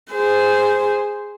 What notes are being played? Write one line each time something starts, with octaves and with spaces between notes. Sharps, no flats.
G#4 C5